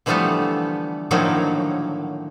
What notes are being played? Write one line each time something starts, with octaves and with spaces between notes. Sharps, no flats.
D3 E3 F3 G3 A3 B3
A2 D3 D#3 F3 F#3 A#3